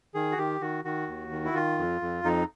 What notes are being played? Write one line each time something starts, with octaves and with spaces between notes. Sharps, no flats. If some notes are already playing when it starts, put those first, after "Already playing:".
D#3 G#4
F#4
D#3 G4
D#3 F#4
D#3 F#4
D#2
D#3
E4
D#3 F4
F2
F2
F2 D#4